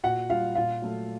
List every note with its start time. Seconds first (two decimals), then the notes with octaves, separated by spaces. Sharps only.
0.04 A#2 F#4 F#5
0.29 G3 F4 F5
0.55 A#2 F4 F5
0.82 F#3 A3